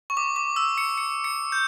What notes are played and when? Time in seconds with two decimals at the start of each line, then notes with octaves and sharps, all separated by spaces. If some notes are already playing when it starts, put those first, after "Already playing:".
0.10 C#6
0.17 D6
0.36 D6
0.56 E6
0.78 C#7
0.98 C#7
1.24 C#7
1.52 G6